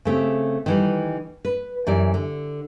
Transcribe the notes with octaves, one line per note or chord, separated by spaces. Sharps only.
C#3 A3 C4 G4
D#3 E3 G3
B4
F#2 E3 G4 D5
D3